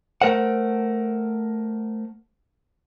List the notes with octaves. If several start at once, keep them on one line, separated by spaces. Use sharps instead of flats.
A3 A#4 C5 F#5